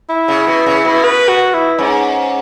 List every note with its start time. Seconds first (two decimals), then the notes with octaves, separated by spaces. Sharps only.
0.10 E4
0.28 C#3
0.47 B2
0.66 C#3
0.85 B2
1.04 B4
1.29 F#4
1.54 E4
1.78 G#2 C#4